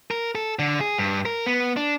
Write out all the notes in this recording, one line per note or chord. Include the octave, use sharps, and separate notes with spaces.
A#4
A4
D3
G#4
G2
A#4
B3
D4